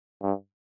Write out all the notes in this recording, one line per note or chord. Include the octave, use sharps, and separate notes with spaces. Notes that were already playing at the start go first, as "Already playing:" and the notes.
G2